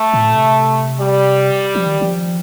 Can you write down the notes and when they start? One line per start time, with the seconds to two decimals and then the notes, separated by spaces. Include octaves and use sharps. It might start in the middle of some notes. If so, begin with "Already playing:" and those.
Already playing: A3
0.14 A2
0.30 A#2
0.35 C3
1.00 G3
1.75 F3
1.86 D#3
2.02 D#3
2.07 F3